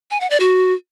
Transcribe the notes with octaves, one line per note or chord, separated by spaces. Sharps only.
G#5
F#5
D5
F#4